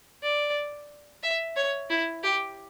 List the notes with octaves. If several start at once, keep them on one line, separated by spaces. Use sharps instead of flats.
D5
E5
C#5
E4
G4